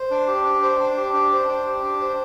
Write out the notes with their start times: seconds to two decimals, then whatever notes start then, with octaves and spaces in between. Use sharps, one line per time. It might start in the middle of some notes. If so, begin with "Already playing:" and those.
Already playing: C5
0.11 D4
0.27 G4
0.45 D4
0.62 C5
0.80 D4
0.97 G4
1.14 D4
1.32 C5
1.48 D4
1.66 G4
1.83 D4
2.01 C5